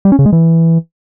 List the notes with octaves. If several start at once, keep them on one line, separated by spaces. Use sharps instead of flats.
G3
C#4
C#3
G#3
E3